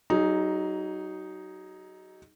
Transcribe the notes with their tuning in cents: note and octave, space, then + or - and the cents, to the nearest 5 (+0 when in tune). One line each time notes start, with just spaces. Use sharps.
F#3 +30 D#4 +0 G#4 +0